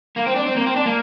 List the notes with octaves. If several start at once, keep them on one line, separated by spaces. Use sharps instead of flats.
A#3
C4
D4
C4
A#3
C4
D4
A#3